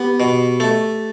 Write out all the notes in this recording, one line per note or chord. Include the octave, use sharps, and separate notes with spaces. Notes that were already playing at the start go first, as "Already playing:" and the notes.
Already playing: B3 G4
B2
A3